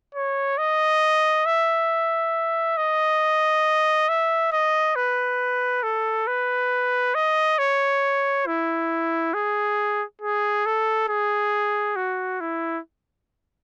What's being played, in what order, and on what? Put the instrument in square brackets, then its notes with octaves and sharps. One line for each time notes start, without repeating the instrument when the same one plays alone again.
[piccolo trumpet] C#5
D#5
E5
D#5
E5
D#5
B4
A4
B4
D#5
C#5
E4
G#4
G#4
A4
G#4
F#4
E4